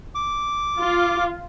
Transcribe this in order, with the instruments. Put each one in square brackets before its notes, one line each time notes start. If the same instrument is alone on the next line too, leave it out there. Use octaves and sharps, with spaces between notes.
[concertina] D6
[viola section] F4